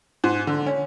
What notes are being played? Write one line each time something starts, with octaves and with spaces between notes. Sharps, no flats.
G#2
D3
C#4